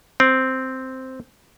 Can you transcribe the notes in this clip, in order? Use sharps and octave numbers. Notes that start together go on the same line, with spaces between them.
C4